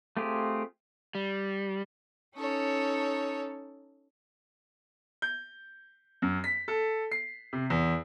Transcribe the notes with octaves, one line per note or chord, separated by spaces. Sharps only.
A3 C4 F4 G4 G#4
G3
C#4 D#4 A4 C#5
G6
F#2
B6
A4
C7
C3
E2